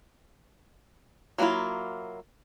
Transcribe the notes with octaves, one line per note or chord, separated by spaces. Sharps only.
F#3 A#3 C#4 E4 F4